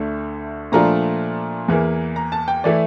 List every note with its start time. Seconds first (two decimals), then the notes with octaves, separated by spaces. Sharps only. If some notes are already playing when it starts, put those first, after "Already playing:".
Already playing: D2 D3 A3
0.72 A#2 F3 A3 D4 F4 A#5
1.68 E2 E3 A#3
2.16 A#5
2.32 A5
2.48 G5
2.64 E3 A3 E4 D5